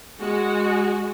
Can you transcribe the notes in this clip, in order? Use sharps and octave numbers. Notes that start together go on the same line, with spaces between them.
G#3 F#4